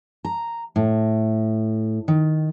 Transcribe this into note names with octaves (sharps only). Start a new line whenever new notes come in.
A#5
A2
D#3